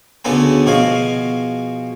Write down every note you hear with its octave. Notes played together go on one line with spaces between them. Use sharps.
D2 C#3 B3 A4 B4 G#5
B2 F3 F#4 G#4 F5 G#5